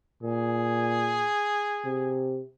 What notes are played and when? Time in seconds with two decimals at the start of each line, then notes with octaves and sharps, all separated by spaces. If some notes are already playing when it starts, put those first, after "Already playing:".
0.23 A#2 G#4
1.85 C3